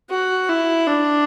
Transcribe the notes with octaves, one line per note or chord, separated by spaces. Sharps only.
F#4
E4
D4